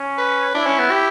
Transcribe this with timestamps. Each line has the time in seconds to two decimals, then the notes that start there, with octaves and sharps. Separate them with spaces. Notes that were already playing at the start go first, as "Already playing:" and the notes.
Already playing: C#4
0.18 B4
0.54 D4 E4
0.66 C#4
0.79 B3
0.91 G4